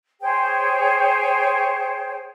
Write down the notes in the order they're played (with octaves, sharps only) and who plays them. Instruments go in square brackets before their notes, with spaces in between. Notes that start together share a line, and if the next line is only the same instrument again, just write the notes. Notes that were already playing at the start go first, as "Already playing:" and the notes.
[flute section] G#4 C5 C#5 G5